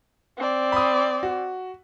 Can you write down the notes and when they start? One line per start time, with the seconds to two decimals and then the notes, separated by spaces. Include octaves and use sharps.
0.38 C4 D5
0.72 B5 D#6
1.23 F#4